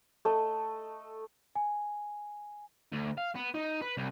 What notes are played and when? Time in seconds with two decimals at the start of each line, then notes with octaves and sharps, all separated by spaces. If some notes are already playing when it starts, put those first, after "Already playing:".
0.25 A3 A4 D#5
1.55 G#5
2.92 D2
3.17 F5
3.35 B3
3.54 D#4
3.82 B4
3.97 C2